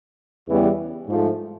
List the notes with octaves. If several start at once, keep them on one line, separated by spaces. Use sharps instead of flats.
E2 C#3 E3 G3 B3
G#2 F3 A3